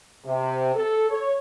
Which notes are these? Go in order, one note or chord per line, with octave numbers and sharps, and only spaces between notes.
C3
A4
C#5